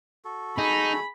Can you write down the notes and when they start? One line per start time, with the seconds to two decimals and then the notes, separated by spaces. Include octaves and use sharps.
0.25 F#4 A4
0.58 D#4 G#4 B5